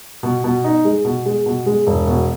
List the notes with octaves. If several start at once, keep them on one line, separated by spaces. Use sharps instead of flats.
B2
B2
D#4
G#3
B2
G#3
B2
G#3
E1
B2